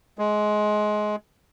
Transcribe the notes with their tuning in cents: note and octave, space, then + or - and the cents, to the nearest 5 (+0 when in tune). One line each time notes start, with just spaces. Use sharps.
G#3 +20